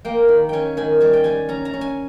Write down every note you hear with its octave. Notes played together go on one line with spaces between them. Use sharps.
A#3 G5
D#3
C#4 G5 G#5
D#3 G#5
G3 G#5
G5
G3 G#5
C#4 A#5
A#5
C#4
G#5